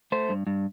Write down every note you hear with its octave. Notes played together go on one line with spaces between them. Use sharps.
A3 C5
G2
G2